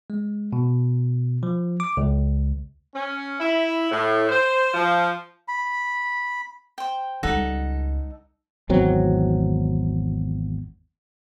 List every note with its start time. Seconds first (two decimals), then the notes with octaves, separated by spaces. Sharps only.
0.10 G#3
0.53 B2
1.43 F3
1.80 D6
1.97 C#2
2.94 C#4
3.40 E4
3.91 A2
4.29 C5
4.74 F3
5.48 B5
6.78 C5 G5
7.23 C#2 G3 D#4 A4 F#5
8.69 G#1 E2 F#3 C4